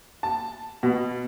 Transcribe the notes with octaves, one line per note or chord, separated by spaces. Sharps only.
A5
B2